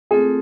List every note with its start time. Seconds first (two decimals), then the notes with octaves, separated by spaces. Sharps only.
0.11 A3 C4 F4 G#4 A4